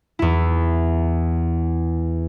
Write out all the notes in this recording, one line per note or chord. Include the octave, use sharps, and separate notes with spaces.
E2 E4